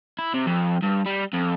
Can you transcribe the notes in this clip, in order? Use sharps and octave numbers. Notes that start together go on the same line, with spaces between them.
E4
C3
F2
G2
G3
F2